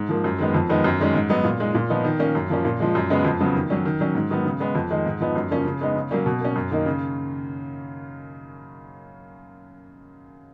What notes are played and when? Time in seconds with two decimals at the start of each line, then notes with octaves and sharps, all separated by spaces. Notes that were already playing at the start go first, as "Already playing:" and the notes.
Already playing: G#2
0.09 F3 A#3
0.24 F#2
0.39 D#3 G#3 B3
0.54 F2
0.69 D#3 G#3 B3 D#4
0.84 F#2
1.00 D#3 G#3 C#4
1.14 G#2
1.29 F#3 B3 D#4
1.44 A#2
1.60 G#3 D#4
1.75 A#2
1.89 F3 B3 D#4
2.04 D#3
2.19 A#3 C#4
2.35 F#2
2.50 F3 A#3 C#4
2.65 A#2
2.80 F3 G#3
2.95 F#2
3.10 C#3 G#3 B3
3.25 F2
3.40 C#3 F#3 B3
3.55 D#3
3.70 F#3 C#4
3.85 D#3
4.00 F#3 C#4
4.15 G#2
4.30 D#3 F#3 B3
4.45 C#3
4.60 G#3 B3
4.75 F2
4.90 D#3 G#3 D#4
5.06 G#2
5.20 F3 B3 D#4
5.35 F#2
5.51 C#3 F3 A#3 C#4
5.66 C#3
5.81 G#3 B3 D#4
5.95 C#3
6.11 F#3 A#3 C#4
6.26 B2
6.41 A#3 C#4
6.56 F#2
6.71 D#3 A#3 D#4
6.86 C#3